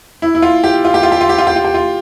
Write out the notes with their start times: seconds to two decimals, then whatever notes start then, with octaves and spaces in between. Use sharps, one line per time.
0.22 E4
0.35 E4
0.42 F4
0.64 G4
0.85 F4
0.94 G4
1.03 F4
1.12 G4
1.21 F4
1.29 G4
1.38 F4
1.47 G4
1.56 F4
1.64 G4
1.74 F4